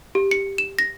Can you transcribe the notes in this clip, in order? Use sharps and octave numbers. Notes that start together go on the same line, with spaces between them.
G4
C#7
E7
A#6